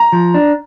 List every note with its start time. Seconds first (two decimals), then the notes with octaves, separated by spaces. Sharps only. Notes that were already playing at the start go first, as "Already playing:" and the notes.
Already playing: A#5
0.12 F3
0.34 D4